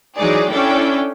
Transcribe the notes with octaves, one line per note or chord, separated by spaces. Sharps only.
E3 F#3 G#3 D#4 G#4 D5
C#4 D4 E4 A4 D5 G5